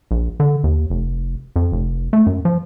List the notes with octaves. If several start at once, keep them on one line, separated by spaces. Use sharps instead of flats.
A#1
D3
D#2
F1
F2
F1
A3
F#2
F3